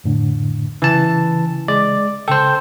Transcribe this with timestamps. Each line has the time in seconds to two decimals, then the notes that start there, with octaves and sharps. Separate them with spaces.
0.04 F2 A2 D3
0.82 C#3 E3 A5
1.68 G#3 D5
2.28 C#3 A4 C5 G5